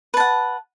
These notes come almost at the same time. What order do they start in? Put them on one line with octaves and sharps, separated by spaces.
B4 A5 F#5